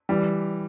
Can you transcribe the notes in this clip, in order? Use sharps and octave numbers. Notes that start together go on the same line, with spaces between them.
E3 G3